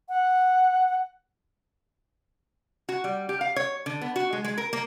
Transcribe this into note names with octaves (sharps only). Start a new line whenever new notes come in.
F#5
F#4
G3
G4
F5
C#5
D3
B3
F#4
G#3
G#3
A#4
A#3